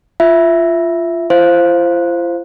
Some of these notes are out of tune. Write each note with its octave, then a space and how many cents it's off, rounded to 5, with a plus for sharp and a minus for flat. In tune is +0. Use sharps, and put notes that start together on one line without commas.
F4 -15 E5 +0
F4 -45 C5 +0 F5 +0